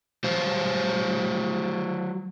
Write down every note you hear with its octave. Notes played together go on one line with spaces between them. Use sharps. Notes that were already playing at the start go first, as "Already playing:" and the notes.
F#3 F#4 C5 F5